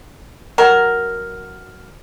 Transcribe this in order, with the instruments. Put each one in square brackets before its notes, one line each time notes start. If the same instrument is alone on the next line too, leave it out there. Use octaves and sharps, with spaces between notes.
[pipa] F#3 A#4